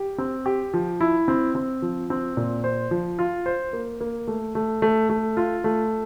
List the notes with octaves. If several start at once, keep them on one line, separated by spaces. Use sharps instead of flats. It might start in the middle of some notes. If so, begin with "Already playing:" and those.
Already playing: G4
C4
G4
F3
E4
C4
C4
F3
C4
A#2
C5
F3
F4
C5
A#3
A#3
A3
A3
A3
A3
F4
A3